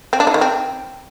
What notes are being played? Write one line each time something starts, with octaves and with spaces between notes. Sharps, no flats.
C4
D4
D#4
D#3
C4